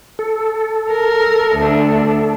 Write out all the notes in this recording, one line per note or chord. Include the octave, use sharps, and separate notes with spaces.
A4
A#4
D2 D4